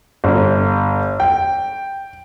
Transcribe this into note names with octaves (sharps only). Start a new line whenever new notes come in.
G1
G5